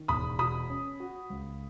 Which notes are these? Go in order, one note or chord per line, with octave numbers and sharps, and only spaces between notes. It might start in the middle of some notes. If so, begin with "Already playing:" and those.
Already playing: D#3
E1 B5 D#6
B2 B5 D#6
C#4
F#4
C#2